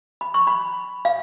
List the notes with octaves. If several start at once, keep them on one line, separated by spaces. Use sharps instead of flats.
B5
C#6
B5
F5